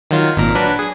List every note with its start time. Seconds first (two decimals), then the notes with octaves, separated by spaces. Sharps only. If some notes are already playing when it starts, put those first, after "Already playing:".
0.11 D#3 F#3 F4
0.37 G#1 A#2 A#4
0.55 F#3 D4 B4
0.79 G#4